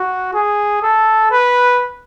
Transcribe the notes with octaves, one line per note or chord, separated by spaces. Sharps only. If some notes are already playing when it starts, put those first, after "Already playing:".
Already playing: F#4
G#4
A4
B4